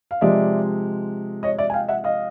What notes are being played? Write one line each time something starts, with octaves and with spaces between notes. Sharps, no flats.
F5
C3 F3 G#3 D5 E5
C#5 D#5
D5 E5
G#5
F5 G5
E5 F#5
D#5 F5